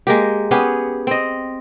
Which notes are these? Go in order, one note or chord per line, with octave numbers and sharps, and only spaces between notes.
G#3 A#3 G4
B3 C#4 G4 G#4
C4 D#5